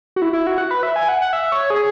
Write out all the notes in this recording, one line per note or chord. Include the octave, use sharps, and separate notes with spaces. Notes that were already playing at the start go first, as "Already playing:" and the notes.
F#4
E4
E4
F#4
F#5
B4
E5
G#5
F#5
F#5
E5
C#5
G#4